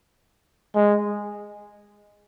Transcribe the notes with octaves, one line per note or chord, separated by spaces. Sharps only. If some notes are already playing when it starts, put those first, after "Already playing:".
G#3